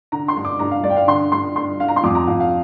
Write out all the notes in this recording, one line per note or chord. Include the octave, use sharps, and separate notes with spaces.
D3 A#5
C6
G2
D6
G2 A#5
F5
G2 D5
G5
F5
D3 C6
G2 C6
G2 C6
G2 F5
A#5
C6
F2 D6
A#5
F2 F5
F5